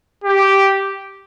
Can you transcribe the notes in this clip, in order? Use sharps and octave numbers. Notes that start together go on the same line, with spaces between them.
G4